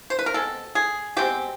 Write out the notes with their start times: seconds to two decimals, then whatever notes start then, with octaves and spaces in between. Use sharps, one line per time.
0.10 C5
0.19 B4
0.26 A#4
0.34 B2 G#3 C4 A4
0.75 G#4
1.17 B2 G#3 C4 G4